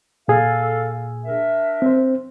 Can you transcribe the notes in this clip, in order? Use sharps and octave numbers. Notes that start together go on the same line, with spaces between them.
A#2 G#4 A4 F5
D4 A#4 E5
C4 C5